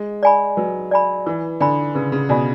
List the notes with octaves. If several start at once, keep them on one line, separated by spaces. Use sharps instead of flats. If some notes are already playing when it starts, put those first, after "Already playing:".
Already playing: G#3
D5 G#5 B5
F#3 B4
D5 G#5 B5
E3 B4
D3 D5 G#5 B5
C#3 B4
C#3
B2 D5 G#5 B5